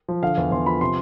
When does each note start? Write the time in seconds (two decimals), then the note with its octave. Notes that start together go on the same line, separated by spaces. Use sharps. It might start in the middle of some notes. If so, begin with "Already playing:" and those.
0.08 F3
0.22 D3 F5
0.37 E2
0.51 E2 C6
0.66 F3 B5
0.81 C3 C6